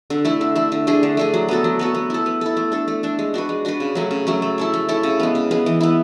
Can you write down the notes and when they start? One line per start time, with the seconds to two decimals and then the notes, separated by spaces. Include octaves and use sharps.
0.10 D3
0.25 A3 E4
0.41 D3
0.55 A3 E4
0.72 D3
0.87 A3 D4 G#4
1.03 D3
1.17 A3 D4 G#4
1.34 F#3
1.48 B3 F#4 A4
1.64 F#3
1.79 B3 F#4 A4
1.94 B3
2.10 E4 A4
2.26 B3
2.41 E4 A4
2.57 A3
2.72 D4 A4
2.88 A3
3.03 D4 A4
3.19 G#3
3.34 D4 F#4 B4
3.49 G#3
3.65 D4 F#4 B4
3.80 C#3
3.95 F#3 A3 C#4
4.11 C#3
4.27 F#3 A3 C#4
4.42 A3
4.58 E4 A4 C#5
4.74 A3
4.89 E4 A4 C#5
5.03 C#3
5.20 G#3 B3
5.35 C#3
5.51 G#3 B3
5.66 E3
5.81 B3 E4